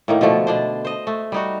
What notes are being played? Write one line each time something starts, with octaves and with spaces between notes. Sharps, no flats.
A2 D#3 A#3
B2 D3 F3 A3
B2 D4 C5
C5 D#5
A3
G3 D#4 F#4